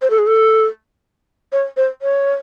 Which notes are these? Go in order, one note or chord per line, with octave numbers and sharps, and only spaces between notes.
C5
A4
G#4
A4
C#5
C5
C#5